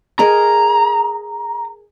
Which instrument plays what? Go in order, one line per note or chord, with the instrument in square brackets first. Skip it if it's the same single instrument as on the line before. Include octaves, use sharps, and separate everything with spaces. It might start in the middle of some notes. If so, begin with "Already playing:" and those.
[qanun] G#4 A#4 D#5 [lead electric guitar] A#5